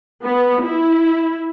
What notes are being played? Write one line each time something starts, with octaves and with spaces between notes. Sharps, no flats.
B3
E4